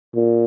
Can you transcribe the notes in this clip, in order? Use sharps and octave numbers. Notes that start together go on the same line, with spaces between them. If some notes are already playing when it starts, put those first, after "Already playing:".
A#2